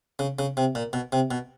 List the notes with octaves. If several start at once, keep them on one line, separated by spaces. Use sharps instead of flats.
C#3
C#3
C3
A#2
B2
C3
B2